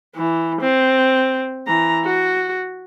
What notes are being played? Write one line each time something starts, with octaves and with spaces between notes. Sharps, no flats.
E3
C4
E3 A#5
F#4